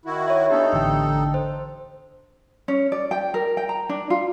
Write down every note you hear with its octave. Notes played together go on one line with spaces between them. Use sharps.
D#3 E4 F#4
C#5 E5
B3 D4 D#4 G4 A4
A1 D3 G5
C5
C#4
D5
G5
A#4
G5
A#5
D4
F4